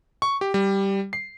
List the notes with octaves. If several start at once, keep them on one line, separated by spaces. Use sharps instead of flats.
C#6
G4
G3
C7